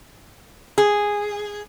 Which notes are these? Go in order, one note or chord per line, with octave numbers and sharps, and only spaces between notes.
G#4